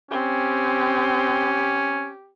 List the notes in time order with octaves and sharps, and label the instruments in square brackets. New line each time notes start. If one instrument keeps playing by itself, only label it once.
[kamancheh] C4 [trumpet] C#4 [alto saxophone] G4